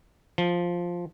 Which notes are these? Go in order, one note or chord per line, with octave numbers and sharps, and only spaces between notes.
F3